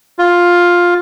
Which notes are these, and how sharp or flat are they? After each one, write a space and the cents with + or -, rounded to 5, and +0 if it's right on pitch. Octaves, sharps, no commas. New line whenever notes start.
F4 +5